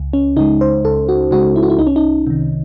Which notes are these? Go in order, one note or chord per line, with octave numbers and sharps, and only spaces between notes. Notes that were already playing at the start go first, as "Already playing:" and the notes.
Already playing: C#2
C#4
C#3 G#3 D#4
C5
C#2 A4
F#4
C#3 G#3 F#4
E4
F#4
E4
C2 D#4
C#4
D#4
C3 D#3